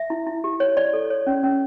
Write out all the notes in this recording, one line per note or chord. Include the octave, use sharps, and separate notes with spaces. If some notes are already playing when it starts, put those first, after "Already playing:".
Already playing: E5
E4
E4
G4
C#5
C#5 D5
A4
C#5
C#4
C#4